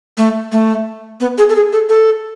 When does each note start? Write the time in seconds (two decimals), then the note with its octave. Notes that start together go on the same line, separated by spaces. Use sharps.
0.17 A3
0.52 A3
1.20 B3
1.38 G#4
1.49 A4
1.56 G#4
1.73 A4
1.89 A4